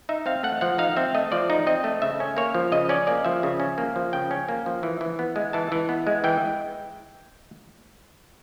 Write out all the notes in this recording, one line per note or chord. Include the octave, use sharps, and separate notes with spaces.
D#4 E5
C4 F5
A3 F#5
F3 F#5
D#4 F5
C4 E5
A3 D#5
F3 D5
D#4
C4 D#5
A3
C#3 E5
C#4
A#3 C#5
F3
C#3 D#5
C#4 D5
A#3 D5
F3 E5
C#3
C#4
A#3
F3
C#3 G5
C#4
A#3
F3
E3
E3
B3
G#3
E3 A5
E3
B3
G#3
E3 G5